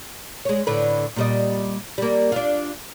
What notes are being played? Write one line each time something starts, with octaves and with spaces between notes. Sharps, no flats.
G#3 C#5
A2 D3 B4
A#2 G3 D#5
G3 A#3
D4 F4